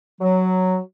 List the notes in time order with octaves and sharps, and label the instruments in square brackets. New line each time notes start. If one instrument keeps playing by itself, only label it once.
[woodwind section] F#3